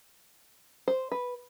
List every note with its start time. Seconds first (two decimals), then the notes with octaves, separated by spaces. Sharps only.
0.88 C5
1.12 B4